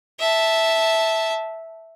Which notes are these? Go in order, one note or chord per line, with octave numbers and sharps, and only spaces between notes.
E5 A5